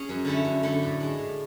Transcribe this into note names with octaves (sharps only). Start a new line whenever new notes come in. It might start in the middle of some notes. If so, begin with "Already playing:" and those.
Already playing: C#4 G#4
F#2
D3 A3 C#4 E4
F#2
D3 A3 C#4 E4
A2
G#3 D4
A2